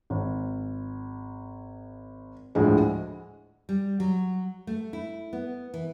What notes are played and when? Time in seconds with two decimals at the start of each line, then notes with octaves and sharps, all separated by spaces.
0.10 G#1
2.55 D2 A2 D3 F3 G#3
3.69 G3
4.00 F#3
4.67 A3
4.93 E4
5.33 B3
5.74 E3